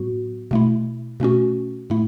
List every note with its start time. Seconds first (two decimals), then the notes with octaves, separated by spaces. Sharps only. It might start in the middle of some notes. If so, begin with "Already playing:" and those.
Already playing: A2 F#3 B3 F#4
0.51 B2 A3 E4
1.20 B2 A3 C#4 F#4
1.90 A2 A3 E4